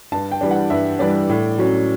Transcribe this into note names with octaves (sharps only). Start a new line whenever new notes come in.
G2 A5
G5
E3 G3 D4
F#5
G2 E5
E3 G3 D4 D5
A2
F#3 C#4